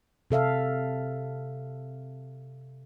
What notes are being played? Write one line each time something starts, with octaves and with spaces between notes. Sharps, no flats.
C3 A4 E5 F5